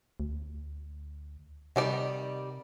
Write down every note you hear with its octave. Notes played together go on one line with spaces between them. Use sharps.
D2
C3 D#3 G3 D5